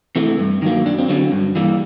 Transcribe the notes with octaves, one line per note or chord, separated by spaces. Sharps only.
C3 E3 A3
G2
D#3 F#3 A#3
F#2 D4
C4
D3 F#3 C#4
G2
E3 G3 A#3